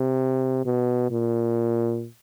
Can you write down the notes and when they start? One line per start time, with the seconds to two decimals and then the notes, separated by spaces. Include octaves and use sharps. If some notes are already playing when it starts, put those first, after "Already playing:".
Already playing: C3
0.65 B2
1.11 A#2